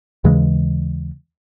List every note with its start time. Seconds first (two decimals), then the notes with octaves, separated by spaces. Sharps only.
0.24 D#2 C#3 E3 G#3